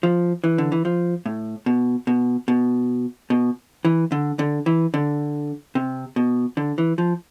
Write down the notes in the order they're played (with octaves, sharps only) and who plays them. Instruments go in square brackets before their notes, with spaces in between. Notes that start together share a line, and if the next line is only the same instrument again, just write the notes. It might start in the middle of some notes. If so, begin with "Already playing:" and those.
[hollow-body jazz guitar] F3
E3
D3
E3
F3
A2
B2
B2
B2
B2
E3
D3
D3
E3
D3
C3
B2
D3
E3
F3